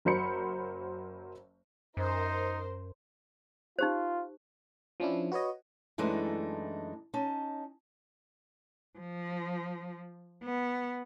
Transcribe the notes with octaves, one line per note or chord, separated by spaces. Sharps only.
F#1 F#3 A#4 C5 B5 C#7
F#2 D#4 A#4 C5
D#4 F4 G4 C5
F3 C#4 D4 E4
F#4 B4 C#5 D#5
F#2 E3 G#3 A3 D4 D#4
C#4 D#4 A5
F3
B3